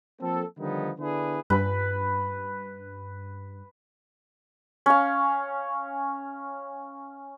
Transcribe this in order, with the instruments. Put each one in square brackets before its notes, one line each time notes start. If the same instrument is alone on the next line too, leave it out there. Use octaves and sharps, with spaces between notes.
[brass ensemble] F3 A#3 C4 A4
D3 D#3 F3 G3 B3 D#4
D3 B3 D4 E4 G#4 B4
[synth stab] G2 [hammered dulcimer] B4
[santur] C#4 F5